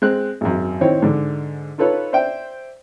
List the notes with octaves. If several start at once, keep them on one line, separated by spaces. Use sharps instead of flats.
G#3 C4 F#6
G#1 F#2
D#3 C4 D#4 E4 C5 C#5
G#2 D3
D#4 F4 A4 B4 C#5
C5 D5 E5 G5